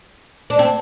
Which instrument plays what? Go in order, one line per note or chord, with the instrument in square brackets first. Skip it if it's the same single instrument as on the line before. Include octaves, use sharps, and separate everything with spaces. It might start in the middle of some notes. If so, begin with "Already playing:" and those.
[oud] D4
C4